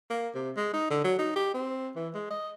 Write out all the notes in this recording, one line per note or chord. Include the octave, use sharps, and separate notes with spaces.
A#3
C3
G#3
D#4
D3
F#3
D#4
G4
C4
E3
G#3
D#5